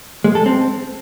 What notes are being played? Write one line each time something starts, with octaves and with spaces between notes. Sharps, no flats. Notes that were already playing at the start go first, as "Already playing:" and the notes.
G#3
A4
C4